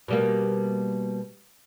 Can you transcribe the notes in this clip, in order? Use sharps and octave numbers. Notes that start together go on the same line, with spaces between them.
B2 G3 A#3